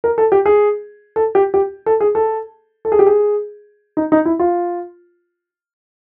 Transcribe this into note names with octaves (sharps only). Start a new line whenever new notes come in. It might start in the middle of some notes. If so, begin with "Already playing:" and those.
A#4
A4
G4
G#4
A4
G4
G4
A4
G#4
A4
A4
G#4
G4
G#4
D#4
D#4
E4
F4